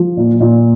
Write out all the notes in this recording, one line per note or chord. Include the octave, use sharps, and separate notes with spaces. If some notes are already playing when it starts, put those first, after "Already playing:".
Already playing: F3
A#2
A#2